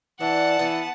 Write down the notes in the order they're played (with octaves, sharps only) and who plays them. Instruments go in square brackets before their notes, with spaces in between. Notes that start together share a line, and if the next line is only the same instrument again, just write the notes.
[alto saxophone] E3 [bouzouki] D4 [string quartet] F#5 A5
[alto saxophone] E3 [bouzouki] B3